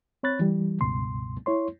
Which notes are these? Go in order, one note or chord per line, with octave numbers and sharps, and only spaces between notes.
C4 C#5 B5 F#6 A6
E3 G3
C#2 G2 B2 C6
E4 C#5 C6